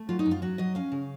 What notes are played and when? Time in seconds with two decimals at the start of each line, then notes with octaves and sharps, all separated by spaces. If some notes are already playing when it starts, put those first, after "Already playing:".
Already playing: A3
0.09 F#3 F4
0.19 D#4
0.26 F#2
0.31 F4
0.42 F#3 F#4
0.58 F#3 D#5
0.75 C#4 F5
0.92 C#3